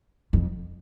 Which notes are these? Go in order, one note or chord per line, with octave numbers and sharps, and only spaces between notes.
F2